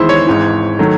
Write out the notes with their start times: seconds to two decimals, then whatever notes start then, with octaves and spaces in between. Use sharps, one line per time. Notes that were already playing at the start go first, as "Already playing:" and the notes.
Already playing: E2 D#3 G#3 E4 C5
0.09 C#5
0.27 G#1 G#2 E3
0.79 D#3 F#3 A3